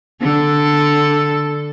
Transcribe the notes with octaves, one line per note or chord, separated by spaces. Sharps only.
D3 A4